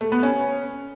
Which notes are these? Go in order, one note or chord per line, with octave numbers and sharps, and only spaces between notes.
A3
B3
C#4